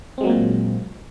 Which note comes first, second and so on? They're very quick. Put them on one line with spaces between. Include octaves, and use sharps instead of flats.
C4 G#3 F#3 A#3 A#2